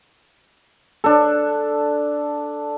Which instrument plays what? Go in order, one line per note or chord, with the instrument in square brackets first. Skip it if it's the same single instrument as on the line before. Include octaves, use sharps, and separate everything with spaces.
[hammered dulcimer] D4 A4